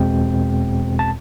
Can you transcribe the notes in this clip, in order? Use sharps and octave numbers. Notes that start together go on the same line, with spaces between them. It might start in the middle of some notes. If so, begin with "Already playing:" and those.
Already playing: E2 B2 G#3 C4 G5
A5